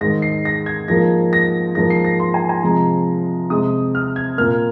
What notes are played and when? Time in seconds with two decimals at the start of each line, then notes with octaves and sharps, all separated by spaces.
0.01 G#2 D#3 G#3 A#6
0.22 C7
0.45 A#6
0.66 G#6
0.88 G#2 F3 A#3 A#6
1.33 A#6
1.75 G#2 F3 A#3 A#6
1.90 C7
2.05 A#6
2.20 C6
2.34 G#5
2.49 G#5
2.63 C3 F3 G#3 A#5
3.50 C3 G#3 D#6
3.95 F6
4.16 G#6
4.38 A#2 A#3 F6